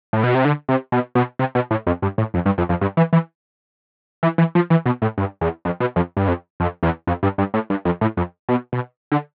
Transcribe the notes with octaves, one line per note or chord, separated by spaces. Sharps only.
A2
B2
C3
D3
C3
B2
B2
C3
B2
A2
F2
G2
A2
F2
G2
F2
F2
G2
E3
E3
E3
E3
F3
E3
B2
A2
G2
E2
F2
B2
F2
G2
F2
F2
E2
F2
G2
G2
A2
G2
F2
A2
F2
B2
B2
D3